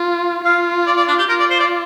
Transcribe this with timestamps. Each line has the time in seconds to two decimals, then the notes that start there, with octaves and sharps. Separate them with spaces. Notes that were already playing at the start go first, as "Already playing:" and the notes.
Already playing: F4
0.44 F4 F5
0.87 D5
0.97 D5
1.08 D4
1.19 G4
1.29 F4 A#4
1.40 D5
1.50 C5
1.60 D5